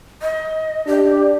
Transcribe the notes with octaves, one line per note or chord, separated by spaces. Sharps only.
D#5
D4 G4